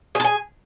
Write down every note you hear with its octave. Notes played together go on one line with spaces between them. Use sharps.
G#4 G#5 A5